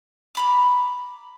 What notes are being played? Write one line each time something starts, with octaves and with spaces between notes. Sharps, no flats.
A#5 B5 D6